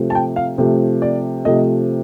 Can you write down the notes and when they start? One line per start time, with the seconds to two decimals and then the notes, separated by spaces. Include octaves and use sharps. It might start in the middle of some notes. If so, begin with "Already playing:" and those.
Already playing: C3 F3 A3
0.10 A5
0.15 G5
0.36 F5
0.58 C3 F3 A3
1.02 D5
1.45 C3 F3 A3 D#5